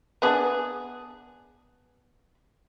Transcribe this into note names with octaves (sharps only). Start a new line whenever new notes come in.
B3 D4 G#4